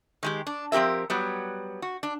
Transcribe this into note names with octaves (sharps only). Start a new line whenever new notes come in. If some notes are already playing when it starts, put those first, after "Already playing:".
D#3 G#3 G4
D4
F3 C4 G4 A#4 E5
F#3 G3 B3
F#4
D4